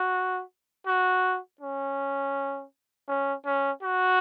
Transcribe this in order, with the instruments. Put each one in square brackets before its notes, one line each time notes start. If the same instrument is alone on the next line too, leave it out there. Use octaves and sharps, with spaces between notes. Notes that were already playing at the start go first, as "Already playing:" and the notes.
Already playing: [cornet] F#4
F#4
C#4
C#4
C#4
F#4